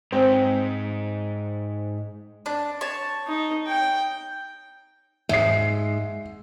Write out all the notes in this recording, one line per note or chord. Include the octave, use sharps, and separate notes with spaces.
G#2 C4
D4
C#5 A5
D#4
G5
G#2 E5 C7